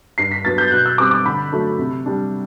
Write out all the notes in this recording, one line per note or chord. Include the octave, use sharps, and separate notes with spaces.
G2 C7
B6
F#3 B3 D4 A6
G6
B2 F#6
E6
G3 C4 D6
D6
D3 B5
F#3 A3 D4
C3
G3 D4